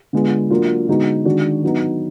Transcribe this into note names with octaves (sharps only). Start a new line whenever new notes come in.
D3 G#3 B3 F4
F#3 A#3 D4 F4
D3 G#3 B3 D#4 F#4
D#3 G#3 D4 F#4
F#3 B3 D#4